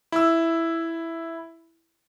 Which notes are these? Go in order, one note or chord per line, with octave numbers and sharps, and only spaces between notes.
E4 E6